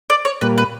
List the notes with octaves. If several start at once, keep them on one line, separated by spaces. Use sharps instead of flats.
D5
C#5
A#2 G3 A#3 B4
B4